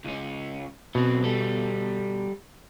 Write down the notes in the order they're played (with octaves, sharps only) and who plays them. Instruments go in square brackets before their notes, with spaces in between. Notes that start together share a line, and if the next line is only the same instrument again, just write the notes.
[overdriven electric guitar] C#2 C#4
[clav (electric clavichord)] B2 [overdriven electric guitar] F#3 C4
[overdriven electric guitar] G3 A4